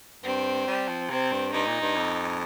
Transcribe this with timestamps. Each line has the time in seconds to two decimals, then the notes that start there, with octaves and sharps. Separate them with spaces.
0.23 G2 C4
0.68 G3
0.89 F3
1.10 C3 C4
1.32 G2
1.53 G2 D#4
1.68 A#2
1.81 G2
1.96 F2